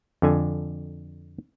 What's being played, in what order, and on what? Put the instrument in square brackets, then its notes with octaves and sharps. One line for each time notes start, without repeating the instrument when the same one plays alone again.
[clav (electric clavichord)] F2 D3 G#5